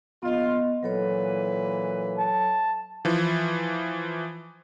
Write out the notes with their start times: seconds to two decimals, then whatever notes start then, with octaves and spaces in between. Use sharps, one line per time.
0.23 A#1 B3 F4 D#5
0.83 A#2 E3 F#3 A4 B4 C#5
2.18 A5
3.05 E3 F3